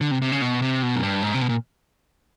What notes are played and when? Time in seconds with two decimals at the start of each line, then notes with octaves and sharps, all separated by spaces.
0.01 D3
0.11 C3
0.22 C3
0.32 C#3
0.42 B2
0.62 C3
0.83 B2
0.96 F#2
1.03 G2
1.22 G#2
1.34 C3
1.41 B2
1.49 A#2